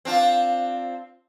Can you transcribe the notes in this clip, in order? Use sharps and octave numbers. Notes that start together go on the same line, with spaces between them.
C4 D4 F4